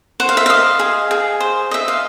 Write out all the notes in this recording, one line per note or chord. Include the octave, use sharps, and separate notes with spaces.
C5 F#5
F5
E5
D#5 F5
G#4
G#4
C5
D#5 E5
F5